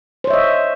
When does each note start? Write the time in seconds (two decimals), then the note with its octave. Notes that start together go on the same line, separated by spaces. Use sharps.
0.24 C5
0.27 C#5
0.30 E5
0.33 D#5